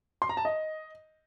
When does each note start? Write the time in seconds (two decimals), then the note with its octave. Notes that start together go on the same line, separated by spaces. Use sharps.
0.22 C6
0.29 A#5
0.37 A5
0.45 D#5